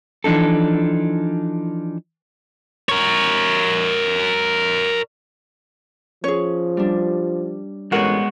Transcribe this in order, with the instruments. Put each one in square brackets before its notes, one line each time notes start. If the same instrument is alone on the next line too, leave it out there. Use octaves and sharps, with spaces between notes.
[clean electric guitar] E3 F3 D4 D#4 A4
[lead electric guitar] A#4 C#5
[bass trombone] F3 [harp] C#4 [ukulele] G#4 C#5
[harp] G3 D4
[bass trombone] A1 [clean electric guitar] G#3 B3 F#4 [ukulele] A#4 C#5